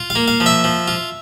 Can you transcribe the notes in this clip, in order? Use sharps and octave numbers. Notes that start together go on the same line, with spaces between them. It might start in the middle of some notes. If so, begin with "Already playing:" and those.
Already playing: F4
F5
A#3
F5
F3
E5
F3
F4